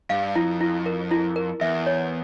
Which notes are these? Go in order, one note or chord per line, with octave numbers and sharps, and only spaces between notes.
G2 F5
F2 E4
E4
A#4
E4
A#4
E2 E5
C#5